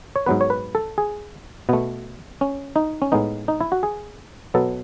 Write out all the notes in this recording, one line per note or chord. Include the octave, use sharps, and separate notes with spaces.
C#5
G#2 F#3 B3 B4
C#5
B4
A4
G#4
B2 A3 B3
C#4
D#4
C#4
A2 G#3 B3 D#4
D#4
E4
F#4
G#4
B2 F#3 B3 A4